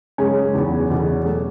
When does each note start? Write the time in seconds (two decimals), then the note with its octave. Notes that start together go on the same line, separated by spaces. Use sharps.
0.18 F#2 C#3 G#3 C#4
0.54 E2 C#3 F#3 B3
0.90 E2 B2 A3
1.25 F#3 A3